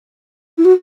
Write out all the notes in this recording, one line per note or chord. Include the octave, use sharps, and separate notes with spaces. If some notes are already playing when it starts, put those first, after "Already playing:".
E4
F#4